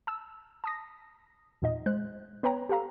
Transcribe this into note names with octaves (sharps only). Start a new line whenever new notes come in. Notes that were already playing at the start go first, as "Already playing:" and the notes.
A5 E6
A5 D#6 A#6
E2 A#2 D#4 D#5
G#3 C5 F#6
B3 B4 C#5 G5 A#5
G4 A4 F5 A#5